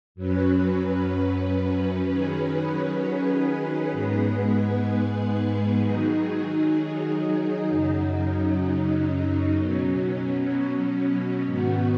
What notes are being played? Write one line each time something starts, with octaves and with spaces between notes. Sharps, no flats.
F#2 F#3 C#4 B4
D#3 F#3 C#4 G#4 B4
G#2 G#3 B3 G#4 B4
D#3 F#3 D#4 G#4
F#2 C#3 F#3 D#4
B2 F#3 C#4
G#2 D#3 B3 F#4